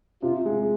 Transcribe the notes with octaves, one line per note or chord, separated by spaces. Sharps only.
C3 F4
G#3